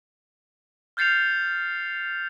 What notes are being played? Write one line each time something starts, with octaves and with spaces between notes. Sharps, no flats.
F6 G6 A6 C7 C#7 F7